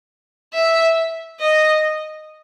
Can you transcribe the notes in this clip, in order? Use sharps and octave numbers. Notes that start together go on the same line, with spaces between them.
E5
D#5